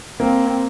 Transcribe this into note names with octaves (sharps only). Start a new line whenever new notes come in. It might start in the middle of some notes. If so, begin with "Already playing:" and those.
A#3 C4